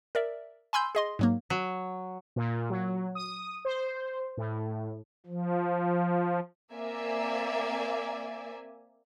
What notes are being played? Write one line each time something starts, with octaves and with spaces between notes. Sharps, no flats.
A#4 D5 E5
G#5 B5 C6 E6 G6
G#4 D#5 C6
G#2 F#3 A#3
F#3
A#2
F#3
D#6
C5
A2
F3
A#3 C4 D5 E5 G#5